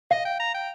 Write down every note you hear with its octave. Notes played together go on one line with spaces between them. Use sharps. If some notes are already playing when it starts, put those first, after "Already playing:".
D#5 F5
G5
A#5
G5